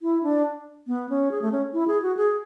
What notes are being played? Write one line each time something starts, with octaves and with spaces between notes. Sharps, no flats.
E4
D4
B3
C#4
G#4
A3
C#4
E4
G#4
F#4
G#4